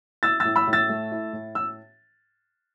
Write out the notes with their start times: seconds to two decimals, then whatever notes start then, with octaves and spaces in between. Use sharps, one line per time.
0.23 E4 E6 A6
0.40 A2 E6 A6
0.56 B5 E6
0.67 A2
0.73 E6 A6
0.89 A3
1.11 E4
1.33 A2
1.55 E6